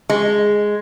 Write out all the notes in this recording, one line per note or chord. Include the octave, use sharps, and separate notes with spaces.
G#3